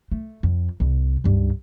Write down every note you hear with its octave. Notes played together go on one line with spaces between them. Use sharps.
A3
F2
C2
C#2 G2